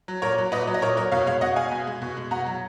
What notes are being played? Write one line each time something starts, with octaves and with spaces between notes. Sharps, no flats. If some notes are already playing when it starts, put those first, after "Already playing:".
F#3
A#2 A#4 C#5
F#3
A#2 B4 D#5
F#3
D#5
A#2 A#4 C#5
F#3 A#4 C#5
B2 C#5 F5
G#3 C#5 F5
B2 D#5 F#5
G#3 F5 G#5
B2
G#3
B2
G#3
B2 F#5 A#5
F#3